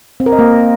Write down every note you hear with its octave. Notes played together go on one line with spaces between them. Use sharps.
C4
A#4
D#5
A#3